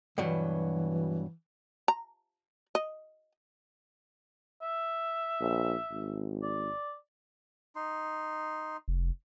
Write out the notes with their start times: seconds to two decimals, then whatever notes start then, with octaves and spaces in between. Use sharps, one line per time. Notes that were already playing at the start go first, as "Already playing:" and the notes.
0.18 G2 B2 E3 F#3
1.88 A#5
2.75 D#5
4.62 E5
5.40 A#1
5.91 G#1
6.42 D5
7.76 D#4 C6
8.88 F1